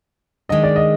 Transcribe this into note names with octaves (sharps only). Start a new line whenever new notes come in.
D#3 G#3 D4 D#5
D5
D#5